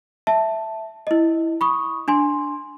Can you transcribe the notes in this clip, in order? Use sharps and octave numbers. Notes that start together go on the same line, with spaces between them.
E5 A5
E4 D#5
B5 C#6 D#6
D4 G#5 C6